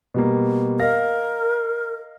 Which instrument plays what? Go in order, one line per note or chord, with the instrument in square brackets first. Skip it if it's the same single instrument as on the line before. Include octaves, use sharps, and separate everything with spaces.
[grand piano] B2 G3 A#3
[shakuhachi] A#4 [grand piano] D#5 F5 A#6